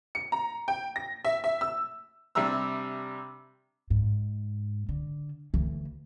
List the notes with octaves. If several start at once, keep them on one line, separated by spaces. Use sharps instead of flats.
C#7
A#5
G5
A#6
E5
E5
E6
C3 G3 D4 E5 A#5 E6
G#2
D3
D2 E3